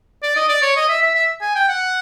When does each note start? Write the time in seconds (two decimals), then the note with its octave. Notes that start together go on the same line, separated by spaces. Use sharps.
0.23 D5
0.36 D#5
0.49 D5
0.62 C#5
0.76 D#5
0.89 E5
1.02 E5
1.15 E5
1.41 G#5
1.55 G5
1.68 F#5